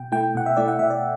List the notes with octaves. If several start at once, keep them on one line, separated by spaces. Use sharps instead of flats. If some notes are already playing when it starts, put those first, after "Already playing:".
Already playing: B2 G5
A3 E4 G5
B2 F#5
E5
A3 E4 D5
F#5
B2 E5
D5